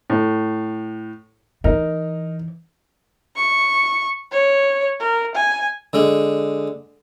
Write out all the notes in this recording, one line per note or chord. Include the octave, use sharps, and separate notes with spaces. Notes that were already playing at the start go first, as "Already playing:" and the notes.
A2
E3 D#4 A#4
C#6
C#5
A#4
G#5
D3 G#3